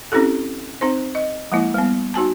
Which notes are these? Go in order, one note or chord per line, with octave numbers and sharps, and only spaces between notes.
C4 C#4 E4 G4 A4
C4 D#4 C5
D#5
F3 G#3 A#3 E4
G3 B3
D#4 F#4 G#5 A5